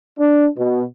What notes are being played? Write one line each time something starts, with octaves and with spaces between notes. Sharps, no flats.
D4
B2